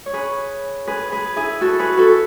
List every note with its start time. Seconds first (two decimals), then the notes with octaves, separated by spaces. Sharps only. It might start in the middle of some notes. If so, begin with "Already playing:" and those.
0.06 C#5
0.13 G#4 B4
0.87 G#4 B4
1.12 G#4 B4
1.36 E4 G#4
1.61 F#4 A4
1.79 G#4 B4
1.97 F#4 A4